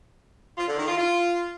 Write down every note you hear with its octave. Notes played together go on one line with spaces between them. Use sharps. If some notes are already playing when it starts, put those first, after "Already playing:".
F4
D3
D#3
F4
F4